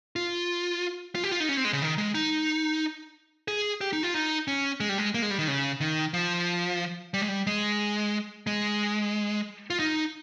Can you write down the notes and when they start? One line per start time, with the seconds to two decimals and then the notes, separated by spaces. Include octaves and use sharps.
0.16 F4
1.15 F4
1.24 G4
1.31 F4
1.40 D#4
1.49 C#4
1.57 C4
1.65 G#3
1.73 C#3
1.82 D#3
1.98 G#3
2.15 D#4
3.48 G#4
3.81 G4
3.93 D#4
4.03 F4
4.14 D#4
4.48 C#4
4.80 G#3
4.89 G3
4.98 G#3
5.14 A#3
5.22 G#3
5.31 G3
5.39 D#3
5.48 C#3
5.81 D#3
6.14 F3
7.14 G3
7.22 G#3
7.28 G3
7.47 G#3
8.47 G#3
9.70 F4
9.79 D#4